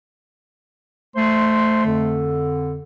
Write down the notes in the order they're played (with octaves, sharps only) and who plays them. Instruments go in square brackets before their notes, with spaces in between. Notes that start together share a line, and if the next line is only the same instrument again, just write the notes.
[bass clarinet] A3 [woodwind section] C5 C6
[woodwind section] F2 D3